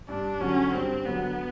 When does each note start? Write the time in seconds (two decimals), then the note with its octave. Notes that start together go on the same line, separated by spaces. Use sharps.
0.09 G2 D4
0.41 D3 F#3 C#4
0.73 G2 C4
1.05 D3 F#3 B3